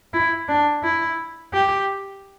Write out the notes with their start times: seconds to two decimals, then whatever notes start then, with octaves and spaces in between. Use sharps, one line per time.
0.13 E4
0.48 D4
0.83 E4
1.53 G4